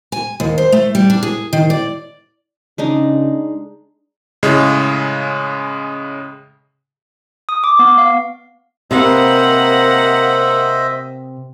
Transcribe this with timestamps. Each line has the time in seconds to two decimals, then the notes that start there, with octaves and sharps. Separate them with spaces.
0.12 G#5
0.40 D#2
0.58 C5
0.72 A3
0.95 G3
1.10 D4
1.23 G#4
1.53 D#3
1.70 D5
2.78 C#3 G#3 D4 D#4
4.43 A2 C#3 G#3
7.49 D#6
7.64 D6
7.79 B3
7.98 F5
8.91 C3 A#3 B4 C5 D#5 E5 F#5